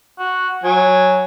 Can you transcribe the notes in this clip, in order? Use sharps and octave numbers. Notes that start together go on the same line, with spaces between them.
F#4
F#3 G#5